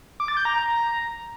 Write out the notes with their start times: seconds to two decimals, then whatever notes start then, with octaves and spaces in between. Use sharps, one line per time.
0.20 D6
0.28 A6
0.37 G6
0.45 A#5